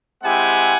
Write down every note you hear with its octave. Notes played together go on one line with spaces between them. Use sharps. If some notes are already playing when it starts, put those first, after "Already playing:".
G#3 C4 E4 G4 F#5 G#5